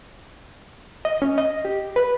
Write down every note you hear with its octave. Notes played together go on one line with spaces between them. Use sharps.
D#5
C#4
D#5
G4
B4